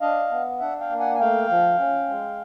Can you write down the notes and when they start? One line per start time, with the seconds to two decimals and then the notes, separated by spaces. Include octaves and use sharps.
0.01 D4 D#5 F5
0.31 B3
0.60 D4 E5 F#5
0.80 F5 G5
0.90 A#3
1.00 F#5 G#5
1.15 G#5
1.19 A3 F5 G5
1.49 F3
1.78 C#4
2.09 G#3